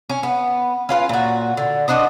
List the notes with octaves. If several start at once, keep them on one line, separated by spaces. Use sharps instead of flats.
C#4
B3
C#4 F4 B4
A#2 F#4
D3
D4 F#4 C5 D#5